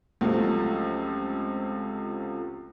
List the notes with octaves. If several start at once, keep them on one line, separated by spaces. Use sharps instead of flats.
C#2 C3 F3 F#3 A3